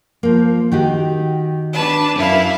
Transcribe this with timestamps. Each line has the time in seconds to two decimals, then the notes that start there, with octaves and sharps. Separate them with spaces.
0.23 F3 A#3
0.72 D#3 F#4 G4
1.72 D4 B4 A5
2.16 F#2 C#4 E4 F5